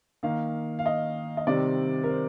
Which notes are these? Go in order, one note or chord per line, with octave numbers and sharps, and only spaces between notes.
D#3 A#3 F5
F5
D#5
D#5
C3 D#3 G3 C4 D5
A#4
C5